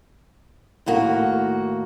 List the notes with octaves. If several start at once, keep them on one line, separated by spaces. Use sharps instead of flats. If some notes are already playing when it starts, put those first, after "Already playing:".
D#2 A2 A#3 F#4